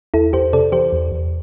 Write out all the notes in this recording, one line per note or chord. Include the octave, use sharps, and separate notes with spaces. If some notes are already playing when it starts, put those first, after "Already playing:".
E2 E4 A4
E2 G4 C5
C3 A4 D5
E3 G4 C5
E2
E2